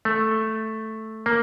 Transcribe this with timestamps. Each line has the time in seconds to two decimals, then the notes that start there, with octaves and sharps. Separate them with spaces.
0.05 A3
1.26 A#3